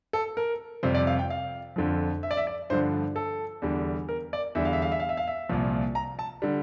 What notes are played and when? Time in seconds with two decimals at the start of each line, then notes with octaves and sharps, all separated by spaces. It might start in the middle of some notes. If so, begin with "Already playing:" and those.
0.13 A4
0.37 A#4
0.83 F2 C3 G3 C5
0.95 D5
1.07 F5
1.19 G5
1.30 F5
1.76 F2 D3 F3
2.23 E5
2.31 D5
2.37 E5
2.47 D5
2.70 G2 D3 F3 C5
3.16 A4
3.62 E2 D3 G3
4.09 A#4
4.33 D5
4.55 E2 D3 G3 E5
4.65 F5
4.73 E5
4.82 F5
4.92 E5
5.00 F5
5.09 E5
5.17 F5
5.27 E5
5.49 C2 A#2 F3
5.95 A#5
6.19 A5
6.42 D3 G3